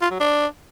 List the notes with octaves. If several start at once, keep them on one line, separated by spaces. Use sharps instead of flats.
F4
F#3
D4